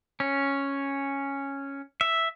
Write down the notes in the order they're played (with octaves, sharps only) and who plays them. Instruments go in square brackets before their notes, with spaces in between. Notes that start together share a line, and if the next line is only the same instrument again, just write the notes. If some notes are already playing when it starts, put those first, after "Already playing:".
[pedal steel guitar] C#4
E5